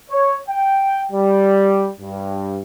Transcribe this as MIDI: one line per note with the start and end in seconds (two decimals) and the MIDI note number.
0.11 0.34 73
0.49 1.04 79
1.11 1.88 55
2.01 2.61 43